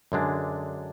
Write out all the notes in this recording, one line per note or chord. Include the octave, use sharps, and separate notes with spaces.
F#2 D3 G#3 D4